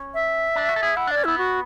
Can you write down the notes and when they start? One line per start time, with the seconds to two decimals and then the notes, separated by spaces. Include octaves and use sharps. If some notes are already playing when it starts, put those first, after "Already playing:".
Already playing: C#4
0.14 E5
0.56 D4
0.69 F#4
0.76 A4
0.83 G#4
0.96 E4 F#5
1.07 D4 D5
1.17 C#4
1.24 B3 E4
1.38 F#4